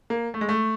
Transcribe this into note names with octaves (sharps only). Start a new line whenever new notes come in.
A#3
A3
G#3
A3